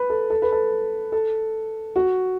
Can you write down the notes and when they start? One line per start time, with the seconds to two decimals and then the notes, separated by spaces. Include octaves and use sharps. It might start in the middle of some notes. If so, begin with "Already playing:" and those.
Already playing: B4
0.10 A4
0.30 A4
0.42 B4
0.52 A4
1.12 A4
1.96 F#4